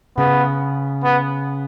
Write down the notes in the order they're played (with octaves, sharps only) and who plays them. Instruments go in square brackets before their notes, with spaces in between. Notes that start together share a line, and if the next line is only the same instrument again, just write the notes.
[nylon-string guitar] C#3 [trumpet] B3
[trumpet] B3